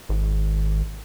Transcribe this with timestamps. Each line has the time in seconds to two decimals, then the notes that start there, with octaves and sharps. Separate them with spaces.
0.09 G#1